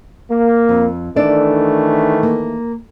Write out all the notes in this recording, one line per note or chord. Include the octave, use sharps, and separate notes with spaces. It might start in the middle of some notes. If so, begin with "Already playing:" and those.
A#3
F2
D#3 E3 A3 D4 A4 D5
A#3